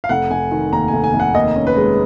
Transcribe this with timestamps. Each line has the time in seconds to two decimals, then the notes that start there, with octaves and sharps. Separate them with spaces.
0.04 F5
0.09 F1 F#5
0.31 F1 G#5
0.51 D#3
0.72 D#2 A#5
0.88 G#5
0.93 F1
1.04 G#5
1.14 F1
1.20 F#5
1.35 D#2 D#5
1.56 C#4
1.67 B4
1.77 G#3